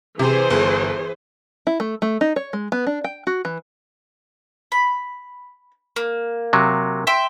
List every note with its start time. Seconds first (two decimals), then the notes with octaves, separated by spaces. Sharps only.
0.19 C3 E3 G#4 C5
0.50 G1
1.67 E4
1.80 A3
2.02 A3
2.21 D#4
2.36 C#5
2.53 G#3
2.72 B3
2.87 D4
3.04 G5
3.27 F#4
3.45 E3
4.72 B5
5.96 A#3
6.53 C3 F#3
7.07 E5 G5 C6